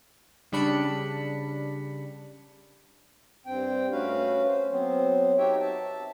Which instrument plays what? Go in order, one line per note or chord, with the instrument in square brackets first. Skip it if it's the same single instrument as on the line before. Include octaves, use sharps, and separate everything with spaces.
[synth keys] C#3 G3 D4 B5 C#7
[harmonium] G2 C4 G5
A3 C#4 F#4 B4 F5
C5
F#3 B3 C4
D#4 F#4 G4 C#5 E5 G5
E5 A5